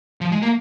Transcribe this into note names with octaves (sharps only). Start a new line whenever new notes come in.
F3
G#3
A#3